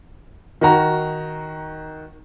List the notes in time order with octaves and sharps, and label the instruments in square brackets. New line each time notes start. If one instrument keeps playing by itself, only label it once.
[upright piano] D#3 F#4 A#5